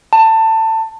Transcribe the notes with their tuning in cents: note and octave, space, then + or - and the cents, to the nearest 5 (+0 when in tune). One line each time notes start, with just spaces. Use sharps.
A5 +20